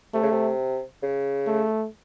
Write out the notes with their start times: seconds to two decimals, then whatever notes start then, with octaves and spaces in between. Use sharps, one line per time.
0.14 C3 A3
0.23 C#3
0.31 C3
1.03 C#3
1.47 A3